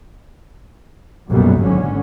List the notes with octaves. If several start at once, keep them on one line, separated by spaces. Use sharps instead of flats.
B1 F#2 A#2 G3 B3
G#1 G#2 D3 F#3 C#4